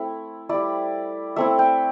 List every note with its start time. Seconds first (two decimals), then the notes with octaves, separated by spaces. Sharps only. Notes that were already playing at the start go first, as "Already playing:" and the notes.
Already playing: A3 C4 E4
0.49 G3 E4 D5
1.36 A3 C4 E4 E5
1.59 G5